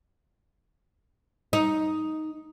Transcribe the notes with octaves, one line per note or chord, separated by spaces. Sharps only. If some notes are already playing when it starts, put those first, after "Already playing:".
D#4